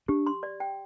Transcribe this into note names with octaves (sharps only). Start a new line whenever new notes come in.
D4 G4
C6
D5
G5